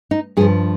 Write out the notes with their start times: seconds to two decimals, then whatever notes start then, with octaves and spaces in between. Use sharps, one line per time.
0.11 D#4
0.37 G2 G#4
0.41 F3